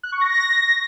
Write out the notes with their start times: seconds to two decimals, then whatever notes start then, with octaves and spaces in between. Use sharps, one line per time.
0.03 F#6
0.12 C#6
0.21 A#6